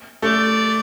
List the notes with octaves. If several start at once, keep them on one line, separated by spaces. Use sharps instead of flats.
A3 D5